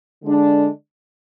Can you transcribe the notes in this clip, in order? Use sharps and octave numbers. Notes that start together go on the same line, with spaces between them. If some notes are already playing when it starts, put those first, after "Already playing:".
D3 G#3 D4